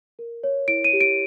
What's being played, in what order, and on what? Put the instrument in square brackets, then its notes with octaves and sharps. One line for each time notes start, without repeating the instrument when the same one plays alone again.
[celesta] A#4
C#5
E4 D7
D#7
G4
D7